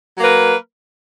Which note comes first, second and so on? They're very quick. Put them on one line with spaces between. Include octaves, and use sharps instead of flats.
F#3 A#3 A#4 B4